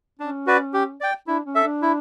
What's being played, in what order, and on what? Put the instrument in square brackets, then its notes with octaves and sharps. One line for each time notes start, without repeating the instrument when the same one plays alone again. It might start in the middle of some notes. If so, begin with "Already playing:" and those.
[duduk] C#4 [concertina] D4
[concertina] F#4 B4 D5
G4
D5 G5
[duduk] D4 [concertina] E4
[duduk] C#4
[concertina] A4 E5
[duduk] D4
[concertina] E4